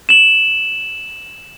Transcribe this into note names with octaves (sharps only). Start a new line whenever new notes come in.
E7 F#7